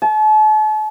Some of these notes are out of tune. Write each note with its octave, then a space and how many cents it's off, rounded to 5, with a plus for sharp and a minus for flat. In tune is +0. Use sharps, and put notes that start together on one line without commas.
A5 -40